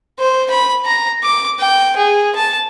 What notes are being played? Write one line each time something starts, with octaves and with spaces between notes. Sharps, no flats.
C5
B5
A#5
D6
G5
G#4
A5